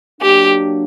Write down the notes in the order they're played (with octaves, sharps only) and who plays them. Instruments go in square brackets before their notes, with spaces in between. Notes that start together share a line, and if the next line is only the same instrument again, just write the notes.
[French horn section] F#3 A#3 D4 [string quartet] G4